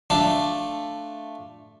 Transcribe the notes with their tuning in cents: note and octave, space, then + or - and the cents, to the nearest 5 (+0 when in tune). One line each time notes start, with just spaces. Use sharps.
A3 +0 D4 +0 F4 -5